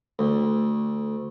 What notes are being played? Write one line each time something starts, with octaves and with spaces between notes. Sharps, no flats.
D2